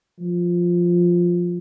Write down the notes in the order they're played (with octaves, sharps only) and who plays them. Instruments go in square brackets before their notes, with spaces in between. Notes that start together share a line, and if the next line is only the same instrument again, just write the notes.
[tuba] F3